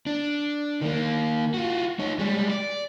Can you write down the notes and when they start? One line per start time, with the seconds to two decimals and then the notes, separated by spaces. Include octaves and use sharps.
0.06 D4
0.81 D#3 A#3
1.54 F4 F#4
1.99 D#4 C#5
2.19 G3 G#3
2.50 D5